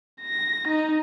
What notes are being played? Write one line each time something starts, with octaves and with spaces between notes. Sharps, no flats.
A#6
D#4